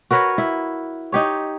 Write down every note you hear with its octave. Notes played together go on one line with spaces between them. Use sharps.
F#4 A#4 B4 C#5
E4
D#4 G4 C#5